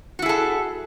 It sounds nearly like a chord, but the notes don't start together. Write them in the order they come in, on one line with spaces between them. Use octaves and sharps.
F#4 E4 G#4 A4